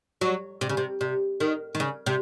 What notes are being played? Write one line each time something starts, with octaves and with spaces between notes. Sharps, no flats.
F#3
C3
C#3
C3
C3
D#3
D#3
C#3
C3